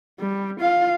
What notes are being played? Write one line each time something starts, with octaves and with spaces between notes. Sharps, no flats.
G3
F4 F5